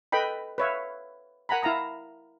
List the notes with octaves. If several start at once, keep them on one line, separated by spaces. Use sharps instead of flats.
A4 B4 D#5 G5 B5
B4 C#5 E5 F5
A#4 F#5 G#5 A#5 B5
E4 F5 A5 A#5 D#6